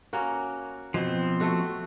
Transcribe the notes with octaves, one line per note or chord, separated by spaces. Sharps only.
A#3 C#4 F#4
B2 F3 C4
A3 F#4